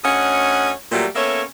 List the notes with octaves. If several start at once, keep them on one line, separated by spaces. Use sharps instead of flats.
D2 C#4 C#5 D#5 F#5
A#2 F#3 G3 A3 G4 A#4
A#3 B3 C#4 A4 C#5 E5